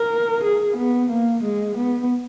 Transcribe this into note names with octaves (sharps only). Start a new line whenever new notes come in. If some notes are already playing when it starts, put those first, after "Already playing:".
Already playing: A#4
G#4
B3
A#3
G#3
B3